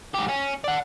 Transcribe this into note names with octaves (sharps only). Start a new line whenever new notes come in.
G#2 G4
C#4
D5 F#5